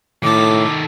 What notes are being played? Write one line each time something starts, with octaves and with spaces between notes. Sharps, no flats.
A2 D#3 A4 D6